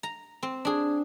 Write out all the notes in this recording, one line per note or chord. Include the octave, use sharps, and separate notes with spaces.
A#5
C4
D4 G#4